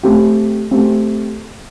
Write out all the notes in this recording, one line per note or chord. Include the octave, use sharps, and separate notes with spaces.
A3 C4 G4
A3 C4 G4